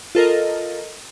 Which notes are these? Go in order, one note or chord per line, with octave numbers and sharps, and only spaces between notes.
F4 A4 A#4 D#5